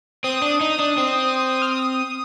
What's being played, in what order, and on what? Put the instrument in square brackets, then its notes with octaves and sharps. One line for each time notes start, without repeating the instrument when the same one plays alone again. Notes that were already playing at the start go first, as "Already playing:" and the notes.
[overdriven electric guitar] C4 [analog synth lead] D#6
[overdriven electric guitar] D4
D#4
D4
C4
[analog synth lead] F6
D#6